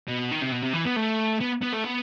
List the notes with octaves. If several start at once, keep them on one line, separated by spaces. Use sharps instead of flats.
B2
D#3
C3
B2
C3
E3
B3
A3
B3
B3
A3
B3